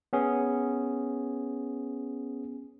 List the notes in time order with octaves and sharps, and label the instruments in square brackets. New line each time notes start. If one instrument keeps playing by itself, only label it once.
[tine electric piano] B3 C#4 G#4